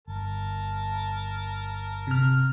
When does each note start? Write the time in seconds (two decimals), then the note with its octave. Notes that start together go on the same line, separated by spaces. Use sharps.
0.08 G1 A#4 A5
2.07 C3 F6